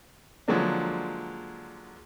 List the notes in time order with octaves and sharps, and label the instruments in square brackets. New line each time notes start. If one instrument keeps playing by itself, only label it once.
[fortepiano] D3 F3 F#3 G#3 A#3 D4